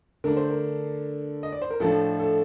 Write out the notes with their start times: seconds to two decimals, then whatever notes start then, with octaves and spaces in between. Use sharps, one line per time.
0.24 D3 A3 D4 A#4
0.37 C5
0.50 A#4
1.43 D#5
1.52 D5
1.62 C5
1.71 A#4
1.80 A2 F3 A3 D4 A4
2.20 A4